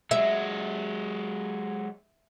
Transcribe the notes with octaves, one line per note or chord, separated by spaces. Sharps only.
F#3 G#3 E5